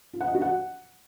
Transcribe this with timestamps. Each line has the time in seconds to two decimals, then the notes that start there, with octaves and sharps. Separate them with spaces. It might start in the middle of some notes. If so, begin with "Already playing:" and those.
0.13 F4
0.21 F#5
0.28 D#5
0.35 F#4
0.42 F#5